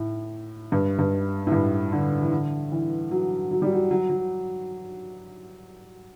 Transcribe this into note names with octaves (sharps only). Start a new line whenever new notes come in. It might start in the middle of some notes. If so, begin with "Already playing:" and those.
Already playing: A2
G2
G2
A2
G2
D3
E3
D3
E3
F#3
F#3
G3
F#3
F#3
F#3